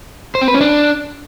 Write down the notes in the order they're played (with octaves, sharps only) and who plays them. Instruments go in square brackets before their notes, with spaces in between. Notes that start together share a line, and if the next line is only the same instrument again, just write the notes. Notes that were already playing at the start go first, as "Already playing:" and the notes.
[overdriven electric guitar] C5
C4
B4
C#4
D4